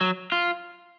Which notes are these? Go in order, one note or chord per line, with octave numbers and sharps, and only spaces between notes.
F#3
F4